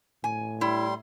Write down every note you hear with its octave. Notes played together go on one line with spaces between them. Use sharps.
A2 G#5
G3 E4 C6